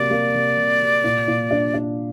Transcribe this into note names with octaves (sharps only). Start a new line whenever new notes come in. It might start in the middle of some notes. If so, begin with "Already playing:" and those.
Already playing: C3 F#3 A#3 D5
A#3
C3
C3
C3
A#2
A#2
D4
D4